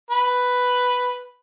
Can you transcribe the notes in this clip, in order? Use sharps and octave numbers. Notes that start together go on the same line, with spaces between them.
B4